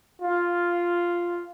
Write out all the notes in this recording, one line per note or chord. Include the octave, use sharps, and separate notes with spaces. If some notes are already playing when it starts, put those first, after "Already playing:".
F4